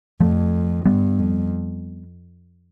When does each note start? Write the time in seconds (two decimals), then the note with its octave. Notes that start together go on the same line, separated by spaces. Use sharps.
0.20 F2 F3 A3
0.86 G2 G3 B3
1.18 F2